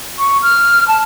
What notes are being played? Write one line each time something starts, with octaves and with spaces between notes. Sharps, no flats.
C#6
F6
A5